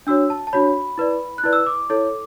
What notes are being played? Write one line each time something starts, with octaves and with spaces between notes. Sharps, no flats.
D4 F#4 C#5 E6
A5
A5
D4 F#4 C#5 B5
E4 B4 D5
F#6
E4 B4 D5
E6
D6
E4 A4 C#5